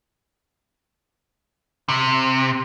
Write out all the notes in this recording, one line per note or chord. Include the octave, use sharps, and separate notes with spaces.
C3